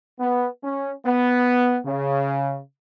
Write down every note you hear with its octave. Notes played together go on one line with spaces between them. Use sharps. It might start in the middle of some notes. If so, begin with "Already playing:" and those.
B3
C#4
B3
C#3